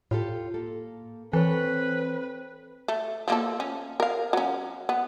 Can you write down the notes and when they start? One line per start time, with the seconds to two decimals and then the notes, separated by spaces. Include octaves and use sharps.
0.11 A2 F4 G4 A4
0.54 A#3 A4
1.33 E3 C4 A4 B4 C#5
2.88 A3
3.28 F3 A#3 A4
3.60 C#4
4.00 A#4 F5
4.33 F#3 C#4
4.89 B3